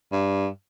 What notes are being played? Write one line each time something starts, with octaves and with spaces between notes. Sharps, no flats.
G2